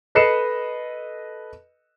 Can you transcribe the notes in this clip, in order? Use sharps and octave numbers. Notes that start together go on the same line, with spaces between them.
A4 B4 D#5 C7 C#7 E7